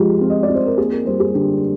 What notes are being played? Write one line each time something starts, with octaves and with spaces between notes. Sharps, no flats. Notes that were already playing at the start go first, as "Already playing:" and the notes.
Already playing: F3 G#3 F4 G4
C4
D#5
D5
C4
C5
A#4
A#3 G#4
A#4
G3 C5
G#4
D3 G4